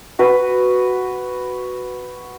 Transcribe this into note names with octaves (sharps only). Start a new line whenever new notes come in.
F#4 B4